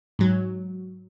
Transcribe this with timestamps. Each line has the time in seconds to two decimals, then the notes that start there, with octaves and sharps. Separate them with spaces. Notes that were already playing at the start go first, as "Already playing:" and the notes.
0.19 G#2 F#3